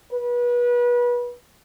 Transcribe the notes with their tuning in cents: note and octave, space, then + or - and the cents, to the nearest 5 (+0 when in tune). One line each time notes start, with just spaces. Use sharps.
B4 -30